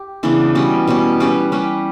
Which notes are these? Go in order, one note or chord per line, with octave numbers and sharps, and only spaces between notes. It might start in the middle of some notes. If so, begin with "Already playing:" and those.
Already playing: G4
C#3 E3 B3 D4
B2 G3 C#4
B2 G3 C#4
G3 C#4 G4 B4
G3 C#4 G4 B4